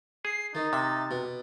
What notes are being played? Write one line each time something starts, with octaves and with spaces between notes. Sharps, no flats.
G#4 C7
D#3 D#4 A6
C3 E5
B2